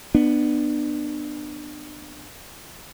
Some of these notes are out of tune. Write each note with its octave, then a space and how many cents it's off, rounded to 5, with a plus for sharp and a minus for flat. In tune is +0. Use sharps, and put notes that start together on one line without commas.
B3 +0 D4 +30